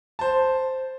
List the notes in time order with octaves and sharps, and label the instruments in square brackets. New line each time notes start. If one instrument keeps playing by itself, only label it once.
[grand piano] C5 A5